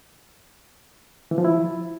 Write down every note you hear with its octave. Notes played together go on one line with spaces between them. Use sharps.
E3
F3
E4